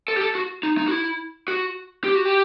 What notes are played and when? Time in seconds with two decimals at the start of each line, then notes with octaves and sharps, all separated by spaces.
0.08 A4
0.17 G4
0.21 A4
0.35 F#4
0.63 D#4
0.78 D#4
0.88 F#4
0.91 E4
1.48 F#4
2.04 G4
2.15 F#4
2.25 G4